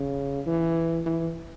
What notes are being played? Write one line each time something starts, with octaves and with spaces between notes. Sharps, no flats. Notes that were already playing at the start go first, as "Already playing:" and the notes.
Already playing: C#3
E3
E3